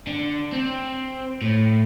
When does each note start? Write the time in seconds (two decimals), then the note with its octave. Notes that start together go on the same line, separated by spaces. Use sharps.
0.07 D3
0.53 C4
1.42 A2